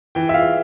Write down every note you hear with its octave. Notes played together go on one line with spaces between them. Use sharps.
E3 G5
E5
F4 F5